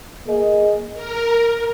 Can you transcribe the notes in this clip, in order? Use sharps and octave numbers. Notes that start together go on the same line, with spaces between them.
A#3 G#4 D#5
A#4